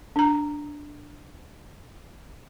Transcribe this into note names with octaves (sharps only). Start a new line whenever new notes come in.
D4 A#5